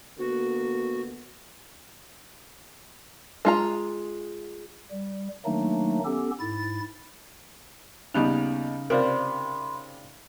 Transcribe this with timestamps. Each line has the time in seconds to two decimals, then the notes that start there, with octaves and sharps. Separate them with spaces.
0.19 D3 A#3 B3 F#4
3.45 G#3 F4 A#5
4.91 G3
5.45 D#3 F#3 A3 A#3 D4 D#4
6.05 B3 C#4 G4 A4
6.40 G#2 E4 A6
8.14 D#2 C#3 G3 B3 D#4 F#6 F7
8.90 C3 F4 A#4 C5 D5 B5 C6